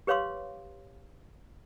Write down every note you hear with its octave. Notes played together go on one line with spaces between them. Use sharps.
G4 B4 C#5 F5 C6 D6